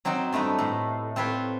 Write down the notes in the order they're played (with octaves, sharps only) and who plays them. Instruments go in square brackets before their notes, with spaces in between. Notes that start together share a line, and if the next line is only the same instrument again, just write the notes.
[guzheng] F#3 C4 D#4 F#4
G2 A3 B3 D#4
A2
C4 F4 B4 C#5